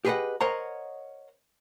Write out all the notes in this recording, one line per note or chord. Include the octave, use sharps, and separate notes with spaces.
G4 G#4 B4 C#5 D#5 F#5
A#4 C5 C#5 D#5 F#5 A#5